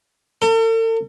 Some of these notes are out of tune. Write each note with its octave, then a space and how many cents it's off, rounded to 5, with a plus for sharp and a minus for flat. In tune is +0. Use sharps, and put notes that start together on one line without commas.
A4 +45